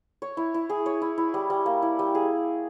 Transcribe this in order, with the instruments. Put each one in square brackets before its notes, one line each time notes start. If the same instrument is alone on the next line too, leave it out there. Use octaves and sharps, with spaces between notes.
[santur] C#5
E4
E4
G#4
C#5
E4
E4
G3
G3
A#3
E4
G3
G#4